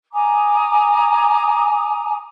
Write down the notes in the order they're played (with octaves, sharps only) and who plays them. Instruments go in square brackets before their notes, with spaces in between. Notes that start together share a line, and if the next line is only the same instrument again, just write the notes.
[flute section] G#5 A#5 D6 D#6